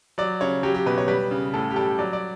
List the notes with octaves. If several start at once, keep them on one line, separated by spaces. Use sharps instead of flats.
F#3 D5
C#3 C#5
F#3 G4
G4
B2 B4
C#5
G3 B4
C#3
A2 A4
G4
G3 A4
F#3 D5
D5